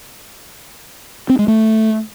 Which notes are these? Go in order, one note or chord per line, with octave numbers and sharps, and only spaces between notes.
C4
G#3
A3